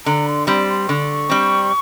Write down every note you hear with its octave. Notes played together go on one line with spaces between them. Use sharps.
D3 A#5
C6
G3 C4 C6
C6
D3 C#6
G3 C4